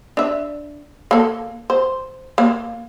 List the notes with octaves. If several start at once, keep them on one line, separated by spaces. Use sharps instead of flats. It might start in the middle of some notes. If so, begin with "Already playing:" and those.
D4 E5
A#3 A4
C5
A#3